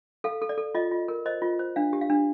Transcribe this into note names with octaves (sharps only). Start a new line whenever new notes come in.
A4 F5
A4
D5
A4
F4 D#5
F4
A#4
C5 D#5
F4
C5
D4 F5
G4
F5
D4